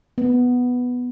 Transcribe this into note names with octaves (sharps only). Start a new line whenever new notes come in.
B3